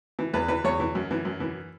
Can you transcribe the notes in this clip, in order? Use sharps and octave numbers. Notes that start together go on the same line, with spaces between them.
E3
E2 B4
E3 B4
E2 C#5
E3
F#2
E3
F#2
E3